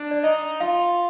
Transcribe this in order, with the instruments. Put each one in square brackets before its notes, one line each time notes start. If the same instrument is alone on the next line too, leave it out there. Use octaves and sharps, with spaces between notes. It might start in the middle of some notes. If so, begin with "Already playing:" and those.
Already playing: [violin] D4
[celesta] D5
[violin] D#4 [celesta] D#5
[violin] F4 [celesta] F5